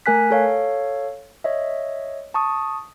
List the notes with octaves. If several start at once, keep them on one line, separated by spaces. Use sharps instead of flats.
A3 A#4 G#5 F#6 B6
A4 C#5 F5
C#5 D#5 E5
A5 C#6 D#6